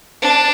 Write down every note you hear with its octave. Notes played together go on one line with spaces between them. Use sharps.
D4